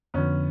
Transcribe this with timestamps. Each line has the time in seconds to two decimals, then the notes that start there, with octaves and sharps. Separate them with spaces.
0.14 F2 D3 F3 B3 C#4